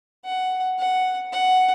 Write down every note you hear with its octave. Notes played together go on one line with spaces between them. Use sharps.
F#5
F#5
F#5